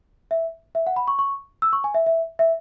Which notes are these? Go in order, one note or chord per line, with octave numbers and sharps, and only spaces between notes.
E5
E5
F#5
B5
C#6
C#6
E6
C#6
G#5
E5
E5
E5